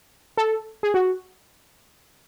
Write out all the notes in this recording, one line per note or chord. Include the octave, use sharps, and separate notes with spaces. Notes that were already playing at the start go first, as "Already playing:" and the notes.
A4
G#4
F#4